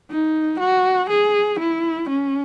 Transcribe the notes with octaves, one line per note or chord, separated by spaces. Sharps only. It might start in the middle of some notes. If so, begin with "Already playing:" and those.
D#4
F#4
G#4
E4
C#4